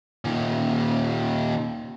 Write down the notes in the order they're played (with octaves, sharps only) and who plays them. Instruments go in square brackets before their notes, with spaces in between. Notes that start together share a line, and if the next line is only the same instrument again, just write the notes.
[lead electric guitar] A#2 D#3